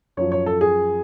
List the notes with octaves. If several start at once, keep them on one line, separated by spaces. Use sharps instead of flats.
F#2 F3 C#5
C#5
A4
G#4